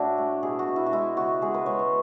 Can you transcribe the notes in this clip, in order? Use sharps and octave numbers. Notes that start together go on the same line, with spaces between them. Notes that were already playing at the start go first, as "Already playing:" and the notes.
Already playing: A2 D4 E4 F#4
A3
B2 G#4
F#4
B2
E4
F#4
G#3 E4
C#3 F#4
G#3 G#4
B4
G#3 C#5
C#5